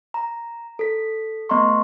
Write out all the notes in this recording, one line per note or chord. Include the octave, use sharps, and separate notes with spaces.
A#5
A4 B6
A3 B3 D#5 A#5 C6 C#6